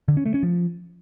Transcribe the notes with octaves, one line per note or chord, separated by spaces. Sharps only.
D3
C#4
A3
C#4
F3